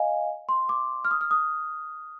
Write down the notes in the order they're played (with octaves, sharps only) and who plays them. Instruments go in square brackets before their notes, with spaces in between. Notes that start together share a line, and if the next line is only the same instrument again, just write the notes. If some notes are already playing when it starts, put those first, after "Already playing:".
Already playing: [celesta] D#5 F5 G#5
C6
D6
F6
D#6
F6
D#6